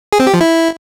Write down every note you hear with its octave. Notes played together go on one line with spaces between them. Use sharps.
G#4
C4
G4
F3
E4